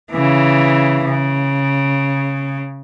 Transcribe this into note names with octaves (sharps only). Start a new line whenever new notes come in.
C#3 E3
C#3